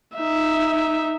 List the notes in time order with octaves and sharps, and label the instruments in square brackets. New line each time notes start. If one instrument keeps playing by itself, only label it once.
[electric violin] D#4 E5